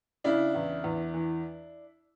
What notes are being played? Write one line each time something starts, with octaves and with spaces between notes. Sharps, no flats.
C#3 D4 E4
E2
E2
E3